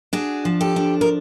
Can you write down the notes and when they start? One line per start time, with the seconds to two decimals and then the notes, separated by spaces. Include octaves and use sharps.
0.13 D4 F#4 G#4
0.45 F3
0.61 G4 A4
0.76 D4
1.01 A#4